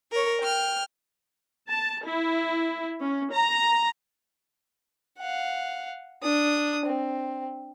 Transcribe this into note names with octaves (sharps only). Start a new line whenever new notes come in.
A#4 C#5
G5 F6
A5
E4
C#4
A#5
F5 F#5
D4 D#6
C4